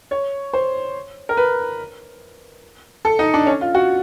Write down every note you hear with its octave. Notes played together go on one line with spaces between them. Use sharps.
C#5
C5
A#4
B4
A4
D#4
D4
C#4
F4
F#4